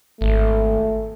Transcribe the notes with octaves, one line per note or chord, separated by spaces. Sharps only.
G#1 A3